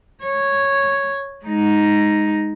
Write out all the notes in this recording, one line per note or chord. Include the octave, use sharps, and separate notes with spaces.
C#5
G#3 D#4